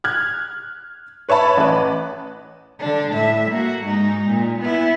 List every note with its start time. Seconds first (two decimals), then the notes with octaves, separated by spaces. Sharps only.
0.04 F6 F#6 G#6
1.29 B4 C#5 E5 A5 B5
1.57 A1 B4
2.79 D3 D4
3.11 A2 E5
3.50 A#3 F#4
3.83 G#2 D#4
4.28 A#2
4.61 B3 E4